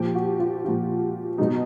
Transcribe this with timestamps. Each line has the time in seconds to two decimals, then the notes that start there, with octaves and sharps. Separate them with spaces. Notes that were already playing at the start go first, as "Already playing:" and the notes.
Already playing: A#2 F3 G4
0.15 F#4
0.39 F4
0.65 A#2 F3
1.38 B2 F#3 D#4